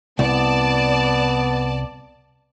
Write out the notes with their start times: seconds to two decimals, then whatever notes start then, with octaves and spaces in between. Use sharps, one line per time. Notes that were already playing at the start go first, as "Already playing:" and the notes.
0.19 C2 B3 D5 A5